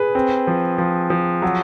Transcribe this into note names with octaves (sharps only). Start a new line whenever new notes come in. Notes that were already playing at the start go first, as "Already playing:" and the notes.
Already playing: G#4 B4
C4
F3
F3
F3
F#3 F#4